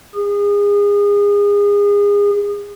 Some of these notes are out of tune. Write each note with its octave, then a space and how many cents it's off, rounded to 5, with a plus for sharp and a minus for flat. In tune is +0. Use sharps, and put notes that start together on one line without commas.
G#4 -30